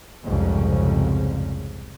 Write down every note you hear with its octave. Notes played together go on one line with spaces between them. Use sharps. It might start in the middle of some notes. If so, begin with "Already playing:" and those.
C2 F2 G#2 C#3